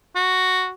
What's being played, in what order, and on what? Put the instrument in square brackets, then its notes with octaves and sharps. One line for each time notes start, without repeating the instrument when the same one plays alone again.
[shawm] F#4